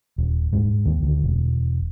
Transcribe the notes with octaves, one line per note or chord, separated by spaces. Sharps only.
D#1
G#2
D#2
D2
E1